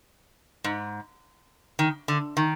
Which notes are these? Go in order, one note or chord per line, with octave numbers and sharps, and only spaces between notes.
G#2
D#3
D3
D#3